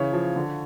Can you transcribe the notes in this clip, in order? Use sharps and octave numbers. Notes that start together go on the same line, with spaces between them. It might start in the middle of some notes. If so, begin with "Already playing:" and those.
Already playing: C#3 E3 C#5
F3
D3